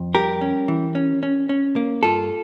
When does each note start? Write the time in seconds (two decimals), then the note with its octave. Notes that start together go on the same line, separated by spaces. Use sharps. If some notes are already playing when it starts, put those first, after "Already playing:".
Already playing: F2
0.14 G3 G4 A#4
0.41 C#4
0.68 E3
0.95 C#4
1.23 C#4
1.49 C#4
1.76 A#3
2.03 G2 F4 A4